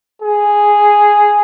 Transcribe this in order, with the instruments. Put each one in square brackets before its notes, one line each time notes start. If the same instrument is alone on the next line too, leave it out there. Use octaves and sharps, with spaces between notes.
[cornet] G#4